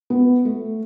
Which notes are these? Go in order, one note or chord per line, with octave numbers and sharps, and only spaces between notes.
B3
A3